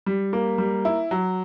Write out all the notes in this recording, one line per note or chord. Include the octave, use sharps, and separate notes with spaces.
G3
A#3
G3
E4
F#3